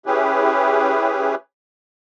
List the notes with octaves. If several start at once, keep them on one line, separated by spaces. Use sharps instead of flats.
C#4 E4 G4 G#4 B4